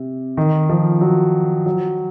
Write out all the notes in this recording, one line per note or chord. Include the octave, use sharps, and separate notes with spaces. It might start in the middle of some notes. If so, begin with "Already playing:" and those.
Already playing: C3
D#3
F3
F#3
F#3